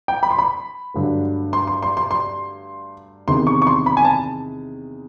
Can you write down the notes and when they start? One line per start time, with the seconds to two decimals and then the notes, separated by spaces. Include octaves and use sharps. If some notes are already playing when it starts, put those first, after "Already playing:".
0.08 G5
0.23 B5
0.31 C6
0.38 B5
0.94 G2 D3 F#3 A3
1.53 C6
1.67 C6
1.83 C6
1.97 C6
2.11 C6
3.28 E2 C3 D#3 C6
3.47 C#6
3.62 C#6
3.67 C6
3.86 B5
3.97 G#5
4.05 A5